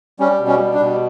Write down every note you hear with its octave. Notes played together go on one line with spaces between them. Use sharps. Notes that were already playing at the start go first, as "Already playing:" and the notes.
G3 C#4
B2
C#4
G3
D4
B2